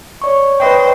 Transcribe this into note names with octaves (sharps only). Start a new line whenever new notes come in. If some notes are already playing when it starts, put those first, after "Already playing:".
C#5 D5 C#6
B4 C5 D#5 G5